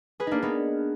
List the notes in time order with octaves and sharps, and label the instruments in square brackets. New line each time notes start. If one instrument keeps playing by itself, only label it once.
[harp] G#4 B4
A#3 D4 D#4
B3 D#4